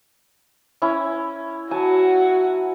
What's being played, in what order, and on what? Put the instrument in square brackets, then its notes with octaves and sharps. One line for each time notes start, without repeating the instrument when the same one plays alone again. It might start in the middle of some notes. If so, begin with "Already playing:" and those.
[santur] C#4 E4
[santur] F#3 G#5 A5 [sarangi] F#4